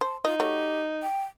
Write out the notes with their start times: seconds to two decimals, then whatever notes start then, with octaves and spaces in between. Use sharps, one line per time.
0.01 C5 A5
0.25 D#4 F4 D#5
0.40 A3 F#4 G4 C#5
1.02 G5